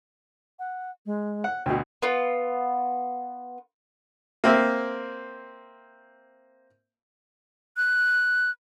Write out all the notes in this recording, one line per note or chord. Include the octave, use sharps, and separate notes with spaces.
F#5
G#3
F#5
D2 B2 G5
B3 F4
A#3 C4 E5
F#6